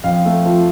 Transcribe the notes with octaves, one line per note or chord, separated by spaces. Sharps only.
F2 F5
A3
F3